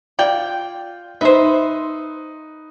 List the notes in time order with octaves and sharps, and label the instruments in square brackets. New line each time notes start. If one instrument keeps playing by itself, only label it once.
[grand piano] F4 [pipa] D5 G5
[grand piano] D#4 B4 [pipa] C5 E5